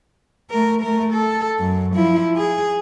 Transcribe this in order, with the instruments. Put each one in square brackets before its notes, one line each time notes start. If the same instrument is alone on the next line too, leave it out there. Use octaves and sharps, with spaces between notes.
[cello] A3 A#4
A3 A#4
A4
F#2
F3 E4
G#4